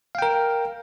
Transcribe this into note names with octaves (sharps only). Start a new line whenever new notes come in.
A#4 F5 G5